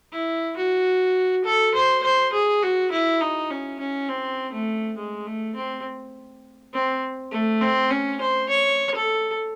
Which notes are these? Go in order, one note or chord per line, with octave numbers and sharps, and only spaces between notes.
E4
F#4
A4
C5
C5
G#4
F#4
E4
D#4
C#4
C#4
C4
A3
G#3
A3
C4
C4
A3
C4
C#4
C5
C#5
A4